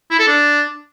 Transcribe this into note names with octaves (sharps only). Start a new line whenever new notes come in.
E4
A4
D4